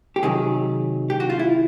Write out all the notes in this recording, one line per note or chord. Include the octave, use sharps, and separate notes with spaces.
G4
C3 D#3 F#3 G#4
G4
F#4
F4
E4